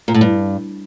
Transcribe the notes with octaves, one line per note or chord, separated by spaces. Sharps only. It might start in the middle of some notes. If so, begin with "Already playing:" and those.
A#2
A2
G2